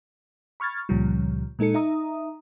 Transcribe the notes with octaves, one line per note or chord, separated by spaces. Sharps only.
B5 C#6 F6 G#6 A6
C#2 A#2 C#3 F3 G3
A#2 G#3 D#4 A4 C#7
D#4 E5 A#5 D#6